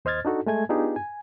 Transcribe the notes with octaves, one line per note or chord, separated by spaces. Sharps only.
D#2 C5 D#5 F6 G#6 A6
D4 D#4 F#4 A4
G#3 A3 G#5 G#6
B3 D4 D#4 F4 G4 G#4
G#5